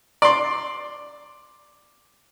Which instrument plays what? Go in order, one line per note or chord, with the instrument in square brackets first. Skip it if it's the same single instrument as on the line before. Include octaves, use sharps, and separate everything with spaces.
[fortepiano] D5 C6